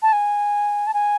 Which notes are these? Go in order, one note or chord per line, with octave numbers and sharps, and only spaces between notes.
A5
G#5
A5
G#5